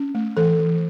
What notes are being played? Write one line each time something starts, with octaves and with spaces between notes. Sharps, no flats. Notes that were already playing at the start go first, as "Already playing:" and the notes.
Already playing: C#4
A3
E3 A4
E3